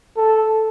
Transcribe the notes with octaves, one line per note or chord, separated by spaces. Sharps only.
A4